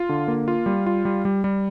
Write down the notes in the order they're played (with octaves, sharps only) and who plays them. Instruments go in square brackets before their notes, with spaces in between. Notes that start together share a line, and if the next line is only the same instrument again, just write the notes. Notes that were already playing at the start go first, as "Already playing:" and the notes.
Already playing: [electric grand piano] F4
D3
A#3
F4
G3
F4
G3
G3
G3